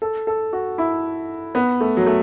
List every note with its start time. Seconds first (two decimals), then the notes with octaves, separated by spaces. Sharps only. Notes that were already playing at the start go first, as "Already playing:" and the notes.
0.02 A4
0.27 A4
0.53 F#4
0.78 E4
1.55 B3
1.80 A3
1.97 F#3
2.06 A3